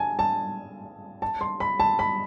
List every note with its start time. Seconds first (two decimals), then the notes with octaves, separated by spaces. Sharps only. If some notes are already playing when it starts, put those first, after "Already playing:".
Already playing: G#5 A5
0.19 A5
1.22 A5
1.41 C6
1.60 B5
1.80 A5
1.99 B5